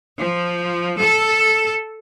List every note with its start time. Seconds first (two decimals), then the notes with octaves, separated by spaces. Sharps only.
0.18 F3
0.99 A4